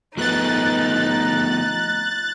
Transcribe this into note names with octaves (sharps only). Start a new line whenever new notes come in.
F3 A3 B3 D#4 F#6 A6